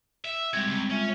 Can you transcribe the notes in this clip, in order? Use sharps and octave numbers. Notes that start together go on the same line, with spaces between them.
E5
G3 G#3 C4 F#4 G4 G#6
C#2
G#3 C#4 F4 E5